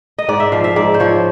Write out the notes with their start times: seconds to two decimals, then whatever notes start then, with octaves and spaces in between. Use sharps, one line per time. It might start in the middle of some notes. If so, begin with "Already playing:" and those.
0.19 D#5
0.29 G#2 D5
0.40 E5
0.52 F3 F5
0.64 E5
0.76 G#2 D5
0.94 C5
1.00 F3 C#5